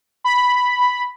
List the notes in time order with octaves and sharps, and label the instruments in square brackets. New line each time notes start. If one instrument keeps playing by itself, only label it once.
[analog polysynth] B5